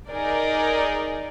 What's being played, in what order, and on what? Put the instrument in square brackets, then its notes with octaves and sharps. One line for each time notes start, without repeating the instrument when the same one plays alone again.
[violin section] D#4 G#4 A#4 D5